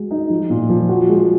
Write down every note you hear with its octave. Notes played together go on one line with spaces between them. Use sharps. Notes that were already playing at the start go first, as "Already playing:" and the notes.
Already playing: G#3 F#4
D#4
F3
A#2
F3
F#4
G#3